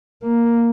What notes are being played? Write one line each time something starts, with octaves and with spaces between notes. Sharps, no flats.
A#3